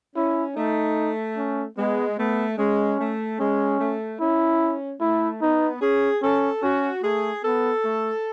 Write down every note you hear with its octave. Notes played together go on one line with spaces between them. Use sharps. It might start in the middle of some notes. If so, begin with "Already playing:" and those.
C#4 E4
A3 D#4
C#4
G#3 B3
A3 B3
G#3 C#4
A3
G#3 C#4
A3
C#4 E4
A3 E4
B3 D#4
C#4 G#4
C#4 A4
C#4 F#4
A3 G#4
B3 A4
A3